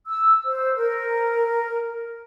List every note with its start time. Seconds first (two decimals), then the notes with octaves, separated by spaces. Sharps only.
0.07 E6
0.45 C5
0.75 A#4